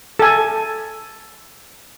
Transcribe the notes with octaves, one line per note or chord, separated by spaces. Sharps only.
A4 G#5